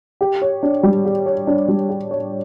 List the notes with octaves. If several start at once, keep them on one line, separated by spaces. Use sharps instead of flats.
G4
C#5
D4
G3
G4
C#5
D4
G3
G4
C#5